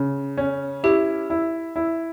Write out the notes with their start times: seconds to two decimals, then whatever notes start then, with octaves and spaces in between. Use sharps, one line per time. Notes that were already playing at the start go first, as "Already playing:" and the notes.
Already playing: C#3
0.37 C#4
0.84 E4 G4
1.30 E4
1.76 E4